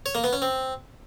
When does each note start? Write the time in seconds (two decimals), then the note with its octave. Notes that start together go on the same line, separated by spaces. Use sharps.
0.06 C#5
0.15 A#3
0.24 B3
0.33 C#4
0.42 C4